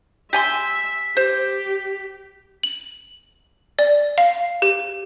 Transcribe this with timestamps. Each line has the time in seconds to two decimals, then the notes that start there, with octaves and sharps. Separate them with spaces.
0.33 G4 E5 G#5 C6 B6
1.17 G4 C5
2.63 F#7
3.79 D5
4.18 F5
4.62 G4